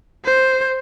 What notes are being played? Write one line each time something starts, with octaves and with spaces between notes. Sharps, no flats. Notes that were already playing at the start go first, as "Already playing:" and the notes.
C5